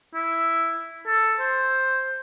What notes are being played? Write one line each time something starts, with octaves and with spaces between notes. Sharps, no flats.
E4
A4
C5